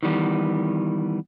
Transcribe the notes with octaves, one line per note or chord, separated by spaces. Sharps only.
D#3 E3 G3 B3